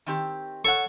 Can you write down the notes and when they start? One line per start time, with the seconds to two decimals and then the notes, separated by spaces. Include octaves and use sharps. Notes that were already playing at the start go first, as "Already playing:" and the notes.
0.06 D#3 C4 G4
0.65 A4 C#5 F#5 C#6